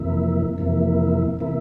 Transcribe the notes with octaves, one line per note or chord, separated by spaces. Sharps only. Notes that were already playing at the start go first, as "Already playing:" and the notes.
Already playing: F2 C3 E3 A#3 E4
F2 C3 E3 A#3 E4
C3 E3 A#3 E4